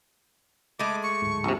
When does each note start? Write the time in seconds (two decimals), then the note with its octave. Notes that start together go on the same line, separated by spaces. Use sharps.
0.79 G#3 A3 D6
1.03 C#6
1.22 D1 G#2
1.44 A#1 C3